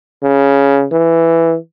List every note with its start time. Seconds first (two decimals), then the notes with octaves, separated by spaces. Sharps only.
0.23 C#3
0.92 E3